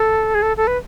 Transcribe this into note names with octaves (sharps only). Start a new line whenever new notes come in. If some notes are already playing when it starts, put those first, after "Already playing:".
Already playing: A4
G#4
A4
A4
B4